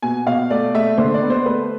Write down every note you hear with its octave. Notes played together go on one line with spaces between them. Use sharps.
B2 G#5
B2 F5
A3 D5
A3 E5
D3 C5
D5
B3
C5
A3 B4